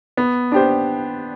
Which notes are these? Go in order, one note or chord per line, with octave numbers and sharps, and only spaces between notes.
B3
D4 G4 C5